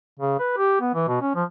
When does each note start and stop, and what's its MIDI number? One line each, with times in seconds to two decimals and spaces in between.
0.19 0.36 49
0.40 0.55 71
0.57 0.77 67
0.81 0.93 59
0.95 1.06 52
1.08 1.18 47
1.22 1.33 61
1.35 1.44 53